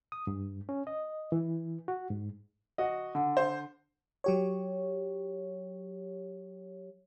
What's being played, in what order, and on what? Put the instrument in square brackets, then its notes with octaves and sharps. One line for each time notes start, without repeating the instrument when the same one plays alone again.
[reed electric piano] D#6
G2
C#4
D#5
E3
F#4
G#2
[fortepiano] F#4 D#5
D3
[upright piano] C5
[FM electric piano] F#3 G4 C#5